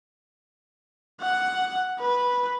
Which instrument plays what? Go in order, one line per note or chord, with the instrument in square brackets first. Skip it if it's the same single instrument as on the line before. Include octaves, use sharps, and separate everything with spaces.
[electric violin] F#5
B4